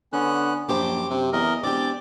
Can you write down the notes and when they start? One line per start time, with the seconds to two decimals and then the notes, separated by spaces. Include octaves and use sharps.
0.13 D3 B3 C#4 F#6
0.69 A#1 F#2 G4 C5 D6
1.10 C3
1.33 E2 A#4 D#5
1.64 E1 C4 G4 D5 D6